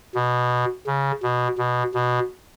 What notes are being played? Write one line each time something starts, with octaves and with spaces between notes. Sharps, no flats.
B2
C#3
B2
B2
B2